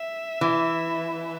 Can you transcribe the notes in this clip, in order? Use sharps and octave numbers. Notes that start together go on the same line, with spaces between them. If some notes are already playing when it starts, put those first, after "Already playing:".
Already playing: E5
E3